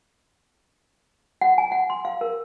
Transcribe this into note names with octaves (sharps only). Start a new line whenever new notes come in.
F#5
G#5
F#5
C6
F5
A#4